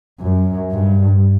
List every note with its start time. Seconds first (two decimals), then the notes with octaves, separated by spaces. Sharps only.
0.20 F#2
0.72 G2